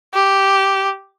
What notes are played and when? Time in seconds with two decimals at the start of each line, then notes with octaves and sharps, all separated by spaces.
0.14 G4